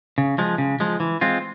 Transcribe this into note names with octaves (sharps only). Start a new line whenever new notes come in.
C#3
F3 G#3
C#3
F3 G#3
E3
G#3 C4 F4